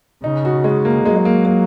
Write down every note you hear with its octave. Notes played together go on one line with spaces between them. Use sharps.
C#3 D#4
F#4
G#3
A#3
F#3 G#3
G#3
A#3
A#3